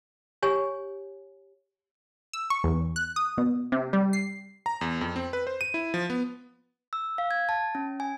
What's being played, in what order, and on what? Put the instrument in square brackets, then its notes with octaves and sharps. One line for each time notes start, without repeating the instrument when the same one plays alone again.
[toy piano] G4 C#5 G#5
[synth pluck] E6
C#6
E2
F#6
D#6
B2
C3
G3
C7
[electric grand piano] A#5
E2
F2
C4
B4
C5
D#7
E4
F3
B3
[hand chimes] E6
F5
G#6
A5
C#4
G#5